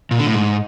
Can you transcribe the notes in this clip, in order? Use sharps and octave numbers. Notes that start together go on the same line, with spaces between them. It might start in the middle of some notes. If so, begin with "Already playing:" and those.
A#2
D3
A2
G#2